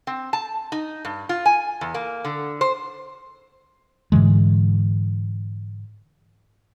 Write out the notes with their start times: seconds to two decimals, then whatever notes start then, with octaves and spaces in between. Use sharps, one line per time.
0.07 C4
0.33 A5
0.72 D#4
1.05 G2
1.29 F4
1.46 G#5
1.81 E2
1.94 A#3
2.25 D3
2.61 C5
4.12 G#2 D3 E3 G#3